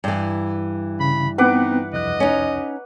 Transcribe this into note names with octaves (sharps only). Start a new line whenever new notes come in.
G2 E3
C#3 B5
B3 C4 D#4 B4 F#5 G5 D6
C2 F2 D#5 F#6
C#4 D#4